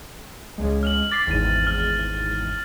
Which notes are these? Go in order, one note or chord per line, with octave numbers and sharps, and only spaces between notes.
C#2 G#3
F6 F7 F#7
D6 A6 B6 C7
G#1 E2 A6 D#7
F6